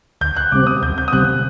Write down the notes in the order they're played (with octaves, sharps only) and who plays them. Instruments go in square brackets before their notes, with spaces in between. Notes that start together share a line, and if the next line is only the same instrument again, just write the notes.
[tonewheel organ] D2 [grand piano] G6
[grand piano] F#6
[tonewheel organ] C3 G3 C4 [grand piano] D6
[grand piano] D#6
[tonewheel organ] D2 [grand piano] G6
[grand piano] G6
D#6
[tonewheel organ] C3 G3 C4 [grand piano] F#6